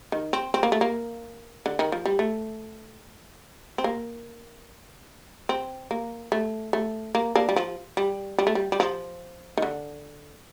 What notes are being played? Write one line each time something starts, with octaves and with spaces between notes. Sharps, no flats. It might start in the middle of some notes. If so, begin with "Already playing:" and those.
D#3
C4
C4
A#3
A3
A#3
D3
D#3
F3
G3
A3
C4
A#3
C4
A#3
A3
A3
A#3
A#3 D4
G3
F3
G3
G3
A3
G3
G3
F3
D#3
D3